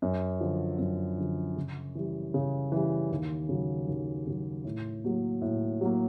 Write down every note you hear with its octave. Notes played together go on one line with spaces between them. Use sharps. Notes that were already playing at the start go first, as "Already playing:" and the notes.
F#2
D3 F3
F#2
D3 F3
C#3
E3 G3
C#3
E3 G3
D#2
C#3 F#3
D#2
C#3 F#3
A2
F#3 A#3
A2
F#3 A#3